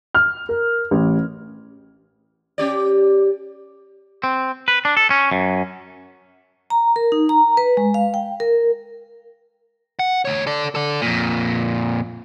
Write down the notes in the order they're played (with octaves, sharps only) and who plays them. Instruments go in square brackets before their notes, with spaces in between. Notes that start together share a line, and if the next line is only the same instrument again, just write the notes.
[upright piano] F6
A#4
A1
[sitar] C#4 G4 D5
[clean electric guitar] C4
B4
D4
A4
C#4
F#2
[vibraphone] A#5
A#4
D#4
A#5
B4
G#3
F5
G5
A#4
[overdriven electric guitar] F#5
D2 C#5
A4 D5
A4 D5
F2 A#2